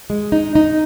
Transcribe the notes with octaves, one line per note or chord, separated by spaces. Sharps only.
G#3
D#4
D#4